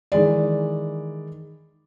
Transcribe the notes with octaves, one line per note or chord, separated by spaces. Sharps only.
D#3 E3 G#3 D5